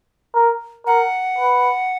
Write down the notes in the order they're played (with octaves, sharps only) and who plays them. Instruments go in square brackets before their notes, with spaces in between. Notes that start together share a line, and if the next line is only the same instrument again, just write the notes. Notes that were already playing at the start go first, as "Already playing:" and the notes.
[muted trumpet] A#4
[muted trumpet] A#4 [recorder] F#5
[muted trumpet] B4